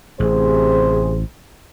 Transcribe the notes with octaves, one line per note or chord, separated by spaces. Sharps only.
A1 C3 G#4 C5